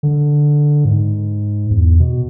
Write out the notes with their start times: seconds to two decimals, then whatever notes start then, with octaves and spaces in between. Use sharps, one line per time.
0.03 D3
0.85 G#2
1.70 E2
2.00 B2